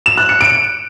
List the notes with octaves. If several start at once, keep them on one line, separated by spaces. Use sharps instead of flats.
E7
F#6
C#7
D7